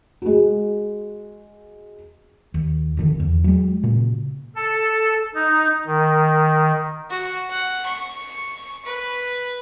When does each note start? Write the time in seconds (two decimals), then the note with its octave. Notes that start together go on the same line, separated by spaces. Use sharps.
0.22 G#3 F#4
2.54 D#2
2.97 F1 D3 D#3
3.20 E2
3.44 F#3 G#3
3.83 A#2 C#3
4.56 A4
5.35 D#4
5.87 D#3
7.10 F#4
7.50 F#5
7.85 C#6
8.85 B4